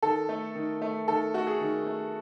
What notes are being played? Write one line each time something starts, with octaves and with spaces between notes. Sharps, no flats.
D#3 A4
A3
D#3
A3
D#3 A4
A3 F#4
G#4
D#3
A3